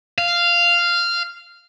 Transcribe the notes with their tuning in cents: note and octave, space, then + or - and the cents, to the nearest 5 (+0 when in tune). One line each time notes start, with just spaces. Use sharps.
F5 -10